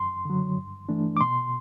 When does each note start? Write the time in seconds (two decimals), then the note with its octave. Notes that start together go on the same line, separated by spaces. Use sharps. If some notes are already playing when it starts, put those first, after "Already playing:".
Already playing: F#2 C6
0.25 D3 F#3
0.57 G2
0.89 E3 A3 D4
1.17 D6
1.20 B2 C6